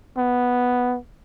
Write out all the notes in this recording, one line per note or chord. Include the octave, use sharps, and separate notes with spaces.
B3